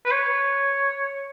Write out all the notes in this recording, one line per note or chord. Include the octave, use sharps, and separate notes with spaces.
B4
C#5